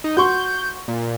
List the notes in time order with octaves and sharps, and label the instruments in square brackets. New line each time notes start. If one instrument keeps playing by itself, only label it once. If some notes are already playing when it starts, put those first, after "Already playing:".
[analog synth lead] D#4
[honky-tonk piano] F#4 C6 C#6 [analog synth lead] G6
[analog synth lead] A#2